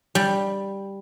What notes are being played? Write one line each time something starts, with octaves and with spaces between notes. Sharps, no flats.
G3